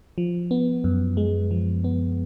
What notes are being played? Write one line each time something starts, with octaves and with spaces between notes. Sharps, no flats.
F3
B3
F#2
G#3
F3
B3